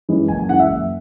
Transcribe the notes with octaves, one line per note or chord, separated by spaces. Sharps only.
F#2 E3 G#3
F#1 G#5
G#5
F#2 E3 G#3 F#5
E5
F#1